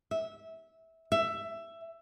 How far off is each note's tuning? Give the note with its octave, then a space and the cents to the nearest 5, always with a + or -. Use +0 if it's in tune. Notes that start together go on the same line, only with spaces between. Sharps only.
E5 -15
E5 +15